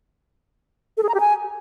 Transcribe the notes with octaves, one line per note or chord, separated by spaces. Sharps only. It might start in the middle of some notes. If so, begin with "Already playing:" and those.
A4
G#4
A#5
G4
G#5